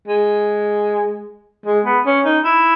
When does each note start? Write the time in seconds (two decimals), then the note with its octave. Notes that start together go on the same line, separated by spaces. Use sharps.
0.08 G#3
1.66 G#3
1.86 B3
2.06 C#4
2.25 D#4
2.44 E4